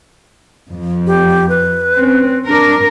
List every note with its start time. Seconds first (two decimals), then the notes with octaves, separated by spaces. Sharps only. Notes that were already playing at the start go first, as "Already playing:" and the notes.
0.72 F2 F3
1.07 G4
1.49 B4
1.97 C4 C#4
2.47 D4 A#4